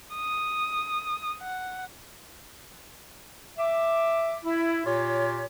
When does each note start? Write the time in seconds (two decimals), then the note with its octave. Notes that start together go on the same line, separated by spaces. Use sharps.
0.15 D#6
1.42 F#5
3.58 E5 D6
4.44 E4
4.86 A#2 F4 G4 C#5